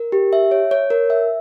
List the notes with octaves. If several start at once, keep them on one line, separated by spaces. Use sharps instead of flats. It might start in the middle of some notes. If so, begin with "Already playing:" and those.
Already playing: A#4
G4
E5
C#5
C#5
A#4
E5